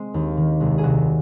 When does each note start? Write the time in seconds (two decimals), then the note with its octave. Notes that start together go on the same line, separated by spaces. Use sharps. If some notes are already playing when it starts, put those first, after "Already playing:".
Already playing: G#3 C4
0.14 D#2
0.37 D#3
0.60 C2 G#3
0.78 G#4
0.83 C2 F#4